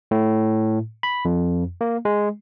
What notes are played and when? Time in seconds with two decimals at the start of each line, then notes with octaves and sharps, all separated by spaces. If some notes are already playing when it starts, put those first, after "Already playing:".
0.11 A2
1.03 B5
1.25 F2
1.81 A#3
2.05 G#3